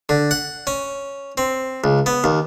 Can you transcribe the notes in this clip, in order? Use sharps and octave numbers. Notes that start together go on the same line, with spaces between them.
D3
F#5
C#4
C4
C#2
B3
D#2